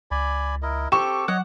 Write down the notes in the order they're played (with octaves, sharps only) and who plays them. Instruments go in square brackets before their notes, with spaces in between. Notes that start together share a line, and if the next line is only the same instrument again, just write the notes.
[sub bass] C#2 [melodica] D5 G#5 B5
[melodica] E4 A#4 D#5
[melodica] C4 A4 [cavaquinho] G4 [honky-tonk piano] C#6 E7
[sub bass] F#3 [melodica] C#5 D#5 [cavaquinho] F#5